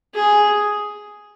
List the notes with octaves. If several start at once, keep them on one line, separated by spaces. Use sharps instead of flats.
G#4